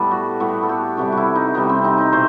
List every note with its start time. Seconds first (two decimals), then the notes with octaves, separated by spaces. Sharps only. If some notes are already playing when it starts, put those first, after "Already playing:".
Already playing: A2 G3 B3 A4 B4
0.11 F#4
0.40 A2 G3 B3 F#4
0.63 A4
0.69 G4
0.97 C3 E3 G3 F#4
1.12 E4 F#4
1.35 D#4
1.54 C3 E3 G3 B3
1.69 C4
1.84 D#4
1.98 D#4
2.12 B2 A3 C5